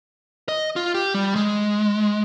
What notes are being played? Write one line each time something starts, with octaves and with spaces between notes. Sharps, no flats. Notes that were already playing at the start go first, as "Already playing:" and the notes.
D#5
F4
G4
G3
G#3